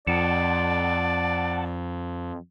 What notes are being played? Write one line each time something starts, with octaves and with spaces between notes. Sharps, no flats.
F2 D5 F#5 A5